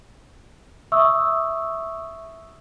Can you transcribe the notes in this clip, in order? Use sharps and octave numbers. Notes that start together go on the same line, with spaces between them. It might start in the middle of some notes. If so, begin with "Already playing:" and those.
E5 C#6 D#6 E6